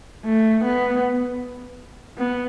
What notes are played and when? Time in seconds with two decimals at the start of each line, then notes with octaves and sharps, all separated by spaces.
0.25 A3
0.65 B3
2.18 B3